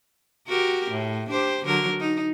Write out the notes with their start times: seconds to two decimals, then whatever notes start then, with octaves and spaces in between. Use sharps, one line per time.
0.48 F#4 G4 A#4
0.91 A2
1.29 D4 G4 C5
1.65 D3 F#3 A#4
2.00 D#4